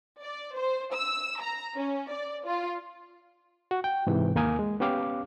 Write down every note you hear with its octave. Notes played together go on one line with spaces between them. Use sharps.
D5
C5
E6
A#5
C#4
D5
F4
F#4
G5
G#2 C3 E3
D#2 A#3 A#4 G#5 D#6
G#3
B3 C#4 G4 F5 D6